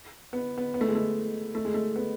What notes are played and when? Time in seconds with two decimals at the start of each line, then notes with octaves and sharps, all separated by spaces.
0.33 B3
0.58 B3
0.74 B3
0.81 A3
0.88 G#3
0.95 A3
1.55 A3
1.65 G#3
1.74 A3
1.96 B3